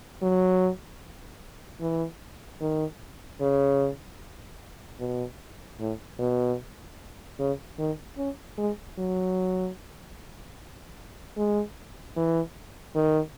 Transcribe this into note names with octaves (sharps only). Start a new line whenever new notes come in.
F#3
E3
D#3
C#3
B2
A2
B2
C#3
D#3
C#4
G#3
F#3
G#3
E3
D#3